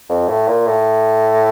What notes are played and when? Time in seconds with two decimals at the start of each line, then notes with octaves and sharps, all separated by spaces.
0.09 F2
0.28 A2
0.48 A#2
0.67 A2